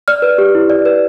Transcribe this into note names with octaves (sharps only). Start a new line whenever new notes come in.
D5 F6
B4
G4
E4
D5
B4